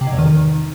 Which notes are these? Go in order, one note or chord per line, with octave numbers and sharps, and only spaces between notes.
C3
G#2
E2
D#3